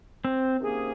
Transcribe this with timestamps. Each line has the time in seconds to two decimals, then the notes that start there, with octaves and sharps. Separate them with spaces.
0.25 C4
0.59 C3 D#3 A#3 C#4 G#4